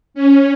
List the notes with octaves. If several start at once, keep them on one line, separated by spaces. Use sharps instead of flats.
C#4